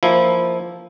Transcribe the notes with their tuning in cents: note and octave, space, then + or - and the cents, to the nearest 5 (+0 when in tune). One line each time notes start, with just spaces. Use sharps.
F3 +0 A#3 +0 E4 -5